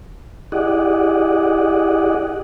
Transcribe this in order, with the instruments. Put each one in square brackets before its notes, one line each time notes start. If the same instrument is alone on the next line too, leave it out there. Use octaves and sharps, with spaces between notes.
[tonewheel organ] E4 G4 G#4 D5 D#5 F#5